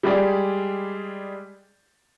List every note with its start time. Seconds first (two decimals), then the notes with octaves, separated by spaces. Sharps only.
0.03 G3 G#3 G4 G#4 D5